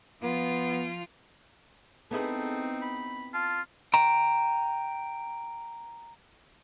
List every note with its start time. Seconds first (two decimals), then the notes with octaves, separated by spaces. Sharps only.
0.23 F3 B3 F4
2.11 B3 C4 D#4 E4 G#4 A4
2.82 B5
3.34 F4 A5
3.94 G5 A#5